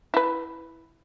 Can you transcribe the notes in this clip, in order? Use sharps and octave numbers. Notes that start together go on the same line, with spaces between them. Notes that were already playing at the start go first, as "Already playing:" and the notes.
E4 B4